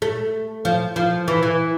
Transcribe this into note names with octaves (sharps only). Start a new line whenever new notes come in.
A3
F3
F3
E3
E3